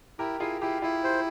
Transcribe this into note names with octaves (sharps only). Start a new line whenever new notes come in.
E4 G4 A#4
E4 F4 G#4
E4 G4
E4 F4
G4 C5